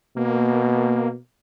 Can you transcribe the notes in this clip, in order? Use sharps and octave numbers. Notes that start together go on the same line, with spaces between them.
B2 A#3